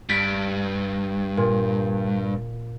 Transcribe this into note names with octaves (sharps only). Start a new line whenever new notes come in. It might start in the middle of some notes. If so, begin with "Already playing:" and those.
G2 A6 B6 D7
A#2